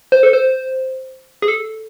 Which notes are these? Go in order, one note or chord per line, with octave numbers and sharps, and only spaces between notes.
C5
A4
C5
G#4
A4